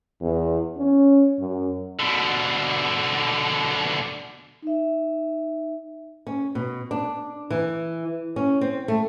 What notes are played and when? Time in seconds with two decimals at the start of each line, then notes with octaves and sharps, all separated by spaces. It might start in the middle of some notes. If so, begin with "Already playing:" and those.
0.21 E2
0.77 C#4
1.40 F#2
2.00 B2 D3
4.62 D#4 E5
6.27 C#4
6.55 B2
6.91 D4
7.50 E3
8.36 C#4
8.61 C4
8.88 A3